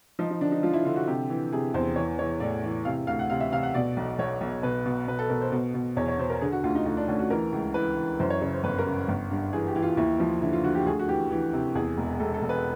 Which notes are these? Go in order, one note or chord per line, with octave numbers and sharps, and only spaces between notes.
F3 D#4
D#4
D3 D4
D#4
F3 F4
E4
D3 F4
F#4
C3 G4
E3
C3 G#4
E2 C5
E3 C#5
E3 C#5
A2 D5
E3
C3 F5
D2 F5
F#5
C3 F5
E5
C3 F5
F#5
B2 D5
B1
B1 C#5
B1
B2 B4
B2
B2 B4
A4
B2 A#4
C5
B2
B2
E2 C#5
C#5
B2 C5
A#4
D3 G#4
F#4
D2 F4
D#4
D2 D#4
D4
D2 C#4
F#4
E3 A#4
C#2
E3 B4
E3
F#2 C5
C#5
C#3 C#5
C5
G1 B4
A#4
C#3
G1
G2
E3 G#4
G4
E3
F4
D#2 E4
F3
D3 E4
F4
D3 F#4
G4
D2 G#4
F#4
E3 G4
E3
C3
E2 G#4
E1
E1 A4
A4
E1
B4